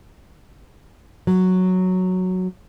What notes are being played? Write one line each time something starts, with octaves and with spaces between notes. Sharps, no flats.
F#3